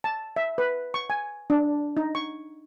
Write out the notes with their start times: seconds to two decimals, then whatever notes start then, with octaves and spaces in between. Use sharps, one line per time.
0.04 A5
0.36 E5
0.58 B4
0.94 C#6
1.10 G#5
1.50 D4
1.97 D#4
2.15 C#6